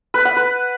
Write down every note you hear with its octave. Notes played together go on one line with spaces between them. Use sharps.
B4
F#5
B4